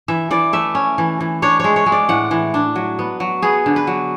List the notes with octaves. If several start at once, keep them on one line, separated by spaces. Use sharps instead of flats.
E3 E5
E3 D5
A3 E5
C#4
E3
E3
D4 C#5
G#3 C#5
C#5
G#3
D5
A2 F#5
E3
D4
F#3
B3
F#3
B3 G#4
D3
B4
F#3